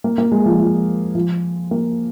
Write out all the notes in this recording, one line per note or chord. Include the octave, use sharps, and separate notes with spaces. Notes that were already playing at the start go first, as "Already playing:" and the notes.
A#3
A#3
G#3
F3
F3
F3
A#3